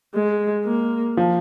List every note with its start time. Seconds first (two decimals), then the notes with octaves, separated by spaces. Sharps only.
0.14 G#3
0.65 A#3
1.17 F3